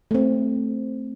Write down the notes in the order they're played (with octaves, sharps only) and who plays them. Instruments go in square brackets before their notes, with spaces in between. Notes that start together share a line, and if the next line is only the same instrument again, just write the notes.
[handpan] A3 C4